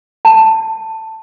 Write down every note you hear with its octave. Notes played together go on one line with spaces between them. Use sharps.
A5